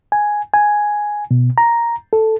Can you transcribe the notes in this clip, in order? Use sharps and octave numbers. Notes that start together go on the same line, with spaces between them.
G#5
G#5
B2
A#5
A4